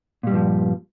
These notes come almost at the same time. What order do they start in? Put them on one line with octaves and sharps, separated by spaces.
A#2 G3 G2 F3